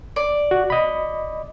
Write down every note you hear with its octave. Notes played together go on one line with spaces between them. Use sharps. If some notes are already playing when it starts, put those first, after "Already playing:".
D5
F#4
D#5 B5